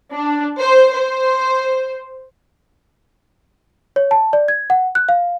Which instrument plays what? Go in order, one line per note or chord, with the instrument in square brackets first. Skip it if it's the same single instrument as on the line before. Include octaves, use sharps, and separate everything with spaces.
[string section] D4
C5
C5
[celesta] C#5
A5
D5
G#6
F#5
F#6
F5